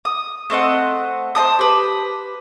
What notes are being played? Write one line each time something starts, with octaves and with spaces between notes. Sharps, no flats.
D#6
A3 C4 D#5 F#5
C5 D#5 A5 D#6
G4 B4